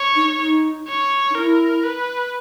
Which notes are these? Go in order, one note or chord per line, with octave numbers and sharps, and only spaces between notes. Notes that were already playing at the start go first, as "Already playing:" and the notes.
Already playing: C#5
D#4
D#4
C#5
D#4
E4 A#4
B4